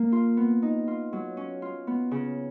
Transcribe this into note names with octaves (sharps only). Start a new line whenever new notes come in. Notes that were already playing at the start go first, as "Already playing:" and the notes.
Already playing: A#3
F4
B3
D#4
F4
F#3
C#4
F4
B3
C#3